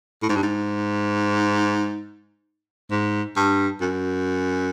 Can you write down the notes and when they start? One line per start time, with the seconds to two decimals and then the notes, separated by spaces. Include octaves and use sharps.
0.23 A2
0.29 G#2
0.36 G2
0.43 G#2
2.91 G#2
3.36 G2
3.81 F#2